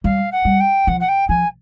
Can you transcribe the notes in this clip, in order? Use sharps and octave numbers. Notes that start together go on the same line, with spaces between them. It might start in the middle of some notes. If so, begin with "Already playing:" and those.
G3 F5
F#5
G3
G5
F3 F#5
F#5
G5
F3 G#5